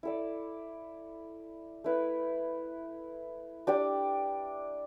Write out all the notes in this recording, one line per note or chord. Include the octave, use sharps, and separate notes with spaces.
E4 A4 D5
A3 E4 B4
D4 G4 D5